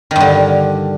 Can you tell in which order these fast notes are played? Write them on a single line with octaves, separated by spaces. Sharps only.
D#3 G2 D3